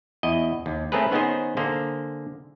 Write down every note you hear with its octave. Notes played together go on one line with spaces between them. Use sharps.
E2 E4 D#5
D#2
A3 C4 C#4 G#4 A#4 B4
D#3 B3 C#4 D#4 G#4 C5
D3 A#3 G#4 C5